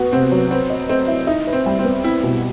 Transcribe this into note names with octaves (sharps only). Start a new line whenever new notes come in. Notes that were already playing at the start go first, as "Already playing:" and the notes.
Already playing: B3 F#4
C3 C4
F#3
C4 B4
D#5
A3 C4
E4
D#4 E4
B4
C4
G3
C4
B3
C4 E4
B2